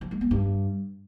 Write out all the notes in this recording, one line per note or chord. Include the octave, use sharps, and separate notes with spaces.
F3
G#3
B3
G2